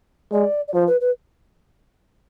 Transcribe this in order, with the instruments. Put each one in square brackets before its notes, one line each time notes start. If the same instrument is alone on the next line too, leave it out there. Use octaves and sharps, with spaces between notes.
[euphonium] G#3 [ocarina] D5
[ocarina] D5
[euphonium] F3 [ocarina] C5
[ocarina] B4
B4